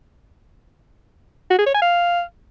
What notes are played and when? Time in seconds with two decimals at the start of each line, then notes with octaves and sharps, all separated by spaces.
1.50 F#4
1.58 G#4
1.66 C#5
1.74 G#5
1.82 F5